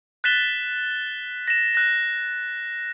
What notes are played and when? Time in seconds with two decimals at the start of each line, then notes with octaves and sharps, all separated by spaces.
0.24 F#6 A6 B6 E7 G7
1.48 A#6 E7
1.75 F#6 A#6